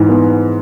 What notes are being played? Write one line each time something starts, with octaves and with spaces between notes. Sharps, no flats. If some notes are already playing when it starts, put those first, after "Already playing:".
Already playing: G#2 E3
B3